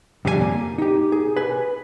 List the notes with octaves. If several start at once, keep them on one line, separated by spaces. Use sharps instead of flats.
F2 D3 G3 F#4 G#5
A#3
D#4 G4
G#4
B4 G#5